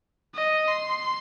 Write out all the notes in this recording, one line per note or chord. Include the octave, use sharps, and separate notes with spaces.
D#5
C6